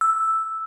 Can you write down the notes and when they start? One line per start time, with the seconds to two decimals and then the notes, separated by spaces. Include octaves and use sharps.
0.01 E6